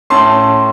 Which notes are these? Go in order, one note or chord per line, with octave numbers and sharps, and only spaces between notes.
A2 A3 C#4 A5 C6